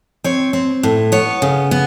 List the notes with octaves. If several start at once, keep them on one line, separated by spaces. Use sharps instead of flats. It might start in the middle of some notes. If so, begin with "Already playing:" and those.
C4 C#5
C4
A2
B3 C#5
C#3
B3